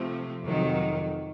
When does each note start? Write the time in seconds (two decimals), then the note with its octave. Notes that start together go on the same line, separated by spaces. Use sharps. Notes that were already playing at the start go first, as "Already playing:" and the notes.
Already playing: C3 F3 A3 C4
0.43 F2 C3 D#3 F#3